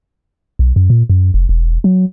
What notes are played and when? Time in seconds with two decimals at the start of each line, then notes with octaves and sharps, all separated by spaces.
0.59 B1
0.76 F#2
0.90 A#2
1.10 F#2
1.34 F1
1.49 E1
1.84 F#3